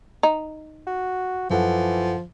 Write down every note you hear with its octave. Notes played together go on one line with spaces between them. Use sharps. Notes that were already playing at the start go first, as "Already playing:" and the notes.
D#4
F#4
F#2 E3 F3 A4 F#5